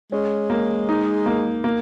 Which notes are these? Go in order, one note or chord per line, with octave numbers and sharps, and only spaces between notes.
G#3 C#4
A#3
D#4
A#3
A#3